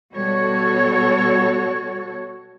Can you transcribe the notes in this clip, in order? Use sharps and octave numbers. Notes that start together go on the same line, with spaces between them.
B2 G3 F#4 A4 C#5